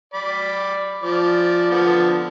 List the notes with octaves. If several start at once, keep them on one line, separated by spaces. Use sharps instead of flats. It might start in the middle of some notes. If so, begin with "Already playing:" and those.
D5 B5
F3 D5
D3 F3 B3